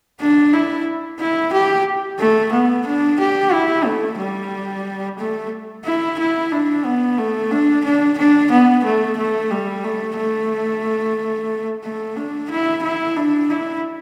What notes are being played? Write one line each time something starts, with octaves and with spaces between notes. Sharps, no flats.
D4
E4
E4
G4
A3
B3
D4
G4
E4
A3
G3
A3
E4
E4
D4
B3
A3
D4
D4
D4
B3
A3
A3
G3
A3
A3
A3
D4
E4
E4
D4
E4